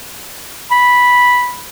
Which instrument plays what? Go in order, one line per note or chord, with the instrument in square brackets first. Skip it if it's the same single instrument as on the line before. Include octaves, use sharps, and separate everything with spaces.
[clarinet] B5